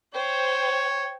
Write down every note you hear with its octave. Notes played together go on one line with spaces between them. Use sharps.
C5 C#5 G5